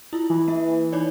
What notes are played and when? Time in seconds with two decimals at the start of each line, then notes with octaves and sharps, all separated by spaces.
0.13 E4 F4
0.30 E3
0.48 A#3 E5
0.92 D#4 C#5 D5